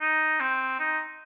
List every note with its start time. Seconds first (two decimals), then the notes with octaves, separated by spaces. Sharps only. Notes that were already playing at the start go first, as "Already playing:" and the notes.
0.01 D#4
0.41 C4
0.79 D#4